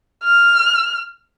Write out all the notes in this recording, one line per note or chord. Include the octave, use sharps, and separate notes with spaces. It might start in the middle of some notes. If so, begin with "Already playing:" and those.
F6